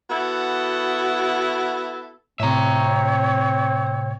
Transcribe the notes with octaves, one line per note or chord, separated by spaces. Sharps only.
B3 E4 F#4 A4
A2 C3 C4 C#5 E5 A#5